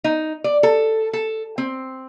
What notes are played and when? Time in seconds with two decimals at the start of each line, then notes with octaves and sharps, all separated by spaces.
0.04 D#4
0.44 D5
0.63 A4
1.13 A4
1.58 C4